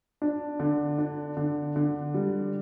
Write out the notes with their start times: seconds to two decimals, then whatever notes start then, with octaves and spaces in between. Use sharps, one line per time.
0.22 D4
0.60 D3
0.98 D4
1.37 D3
1.76 D3
2.14 G3